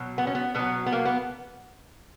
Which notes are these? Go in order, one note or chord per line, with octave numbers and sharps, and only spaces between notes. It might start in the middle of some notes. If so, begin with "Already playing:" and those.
Already playing: B2 F#3
B3
C#4
B3
B2 F#3 B3
B3
A#3
B3